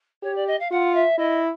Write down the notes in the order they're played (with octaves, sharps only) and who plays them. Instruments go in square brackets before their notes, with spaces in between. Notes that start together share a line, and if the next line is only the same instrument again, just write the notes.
[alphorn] G4 [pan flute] C#5
[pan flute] D5
D#5
F5
[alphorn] F4 [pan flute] F#5
[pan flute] E5
[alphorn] E4 [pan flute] D#5